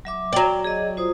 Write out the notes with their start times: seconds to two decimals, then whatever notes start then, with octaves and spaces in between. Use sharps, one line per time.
0.05 F#3 E5 D6
0.33 F#3 D5 G5
0.64 G#4 D#5
0.97 F4 C5 D#6